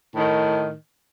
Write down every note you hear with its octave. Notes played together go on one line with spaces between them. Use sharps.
A2 D#3